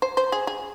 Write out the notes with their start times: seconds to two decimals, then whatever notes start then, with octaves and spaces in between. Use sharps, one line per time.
0.02 C5
0.17 C5
0.32 G#4
0.47 G#4